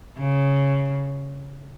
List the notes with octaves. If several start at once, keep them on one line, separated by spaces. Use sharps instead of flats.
C#3